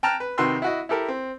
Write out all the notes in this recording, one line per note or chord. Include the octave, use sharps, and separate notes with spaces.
G5 A5 A#5 F6 F#6
B4
C3 D#3 F#4 B4 C6 E6
E4 F#4 D#5
E4 G4 A4 A#4
C4